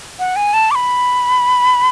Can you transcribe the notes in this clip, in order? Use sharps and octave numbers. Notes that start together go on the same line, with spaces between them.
F#5
G#5
A5
D6
B5